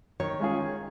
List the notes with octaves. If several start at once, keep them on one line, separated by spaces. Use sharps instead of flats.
D#3 C#5
G#3 C#4 F4 G#4
D#3